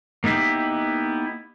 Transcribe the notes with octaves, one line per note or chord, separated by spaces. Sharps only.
A#3 B3 D#4 E4 G4